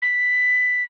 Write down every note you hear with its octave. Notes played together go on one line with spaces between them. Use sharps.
B6